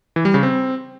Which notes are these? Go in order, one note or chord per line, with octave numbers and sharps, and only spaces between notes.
E3
G3
C#3
C4